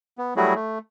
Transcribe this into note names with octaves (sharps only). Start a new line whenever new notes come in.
B3
F#3 G3 A3 E4 F#4 G#4
A3